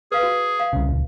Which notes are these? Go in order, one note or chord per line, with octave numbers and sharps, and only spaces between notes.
G#4 B4 F5
F#4
F5
C2 C#3
D#1 C#2